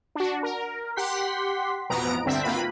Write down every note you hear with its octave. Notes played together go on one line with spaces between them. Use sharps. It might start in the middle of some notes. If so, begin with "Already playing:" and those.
D4 F#4
A#4
G4 F#5 C6 B6
A1 F2 B2 B3 A#5 D7
D2 G2 D3 C4 E5 B6
G#1 A#3 F4 B4 B5